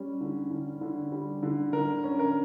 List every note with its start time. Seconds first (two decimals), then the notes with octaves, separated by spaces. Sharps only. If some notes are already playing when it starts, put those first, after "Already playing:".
Already playing: G3 C#4
0.21 D3
0.51 D3
0.81 D3
1.12 G3
1.43 D3
1.73 D3 A#4
2.04 C#4
2.19 A#4